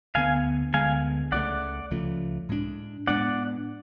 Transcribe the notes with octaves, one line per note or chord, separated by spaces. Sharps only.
D2 D3 G#3 B3 F5 G#5
D2 D3 G#3 B3 F5 G#5
C#2 C#3 F3 A3 D5 F#5
C#2 C#3 F3 A3
A2 G#3 B3 D4
A2 G#3 B3 D4 D5 F#5